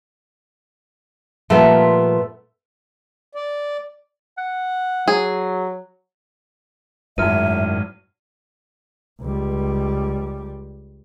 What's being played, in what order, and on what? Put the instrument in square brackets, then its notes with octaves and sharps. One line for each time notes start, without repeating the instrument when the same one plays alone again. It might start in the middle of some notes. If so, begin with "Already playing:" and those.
[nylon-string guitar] A#2 F3 G3 [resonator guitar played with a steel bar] A3 B3
[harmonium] D5
[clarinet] F#5
[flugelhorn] F#3 [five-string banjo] G#4
[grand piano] G#1 F#3 [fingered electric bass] F#2 A2 [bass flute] E5 [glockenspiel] F6 D#7
[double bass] C#2 G3